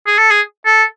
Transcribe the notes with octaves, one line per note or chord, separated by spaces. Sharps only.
G#4
A4
G#4
A4